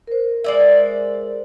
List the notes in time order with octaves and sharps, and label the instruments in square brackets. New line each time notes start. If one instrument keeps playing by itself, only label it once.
[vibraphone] A#4 C5
[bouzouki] G#3 D5 E5